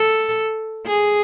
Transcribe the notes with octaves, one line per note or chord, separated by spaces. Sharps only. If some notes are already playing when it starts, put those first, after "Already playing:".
Already playing: A4
G#4